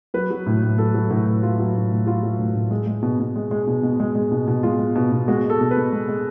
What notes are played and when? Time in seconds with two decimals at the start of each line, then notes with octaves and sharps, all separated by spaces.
0.14 F#3 B4
0.30 F#3
0.46 A2
0.63 A2
0.78 F#3 A4
0.94 F#3
1.10 A2 F#4
1.26 A2
1.43 F#3 F4
1.58 F#3
1.75 A2
1.91 A2
2.06 F#3 F4
2.22 F#3
2.39 A2
2.54 A2
2.71 G#3
2.87 G#3
3.03 B2
3.20 B2
3.36 G#3
3.51 G#3
3.67 B2
3.83 B2
4.00 G#3
4.15 G#3
4.32 B2
4.48 B2
4.63 G#3 F4
4.79 G#3
4.95 B2
5.12 B2
5.28 G#3 F#4
5.44 G#3
5.50 A4
5.61 B2
5.71 B4
5.76 B2
5.93 G#3
6.09 G#3